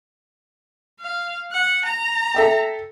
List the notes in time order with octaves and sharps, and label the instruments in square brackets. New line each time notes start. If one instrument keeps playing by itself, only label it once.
[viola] F5
F#5
A#5
[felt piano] A4 E5 G5